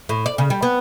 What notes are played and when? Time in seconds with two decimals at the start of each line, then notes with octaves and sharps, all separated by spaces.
0.09 A2
0.26 D5
0.38 C#3
0.50 G3
0.62 B3